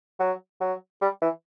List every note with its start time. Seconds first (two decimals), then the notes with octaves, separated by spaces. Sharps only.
0.20 F#3
0.61 F#3
1.01 G3
1.22 E3